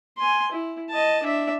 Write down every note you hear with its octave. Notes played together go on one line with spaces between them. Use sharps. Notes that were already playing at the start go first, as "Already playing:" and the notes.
G#5 C6
E4
D#5 A5
D4 E5